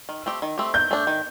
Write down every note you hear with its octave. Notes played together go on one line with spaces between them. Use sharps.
D#3
A3 C4 G4
D#3
A3 C4 G4
D#3 G6
A3 D4
D#3